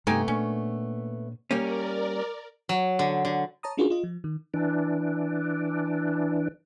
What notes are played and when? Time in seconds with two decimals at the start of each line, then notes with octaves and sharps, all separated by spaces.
0.07 G2 C3 A3 B3 D#4 G4 G#5
0.28 A#2 A#3 C#4 D4
1.51 G3 A#3 C#4 A#4 D5
2.69 F#3
2.99 D3
3.25 D3
3.63 C#5 A5 A#5 D#6
3.77 C#4 D4 F4 F#4 G#4 A#4
3.90 F4 D#5
4.04 F3
4.24 D#3
4.54 E3 D4